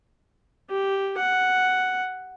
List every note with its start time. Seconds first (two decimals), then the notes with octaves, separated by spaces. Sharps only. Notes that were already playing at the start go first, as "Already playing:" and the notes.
0.69 G4
1.17 F#5